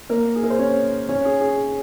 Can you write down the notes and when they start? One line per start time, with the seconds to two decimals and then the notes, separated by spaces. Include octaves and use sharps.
0.09 A#3 A#4
0.35 G#4
0.43 A#4
0.50 C5
0.58 C#4 C#5
1.09 C#4 C#5
1.25 G#4
1.41 G#4